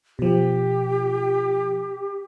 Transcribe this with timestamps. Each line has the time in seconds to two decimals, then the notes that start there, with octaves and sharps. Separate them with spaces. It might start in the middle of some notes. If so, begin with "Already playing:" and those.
0.19 B2 F3 G4